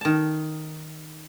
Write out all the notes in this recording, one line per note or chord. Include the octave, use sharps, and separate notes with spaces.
D#3 A5